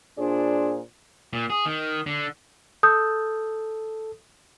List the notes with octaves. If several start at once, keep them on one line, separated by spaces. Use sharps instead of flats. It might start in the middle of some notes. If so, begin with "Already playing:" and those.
A#2 D4 F4 G#4 C5 D5
A#2
G#4
D#3
D3
A4 D#6 G6